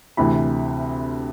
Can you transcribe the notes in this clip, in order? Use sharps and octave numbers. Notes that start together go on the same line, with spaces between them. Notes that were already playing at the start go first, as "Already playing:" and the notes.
D2 C3 E3 B5